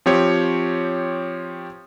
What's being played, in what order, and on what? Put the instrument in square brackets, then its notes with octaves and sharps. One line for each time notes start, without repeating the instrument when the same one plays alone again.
[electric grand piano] F3 C4 G4 C#5